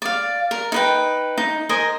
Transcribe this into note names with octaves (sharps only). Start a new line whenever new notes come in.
D5 F5
A#4
D#4 B4 G5
D#4
A#4 C5 D#5 G#5